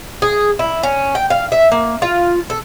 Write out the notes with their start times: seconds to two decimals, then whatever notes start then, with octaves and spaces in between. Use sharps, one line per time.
0.22 G#4
0.59 E4
0.83 C#4
1.15 G5
1.30 F5
1.52 E5
1.72 A#3
2.02 F4
2.50 A4